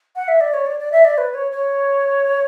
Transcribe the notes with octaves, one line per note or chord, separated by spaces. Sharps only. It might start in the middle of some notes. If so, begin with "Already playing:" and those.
F#5
E5
D5
C#5
D5
D5
E5
D5
B4
C#5
C#5